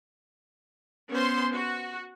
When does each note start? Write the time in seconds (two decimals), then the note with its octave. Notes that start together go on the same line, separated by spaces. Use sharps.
1.12 B3 C#4 C5 C6
1.53 F#4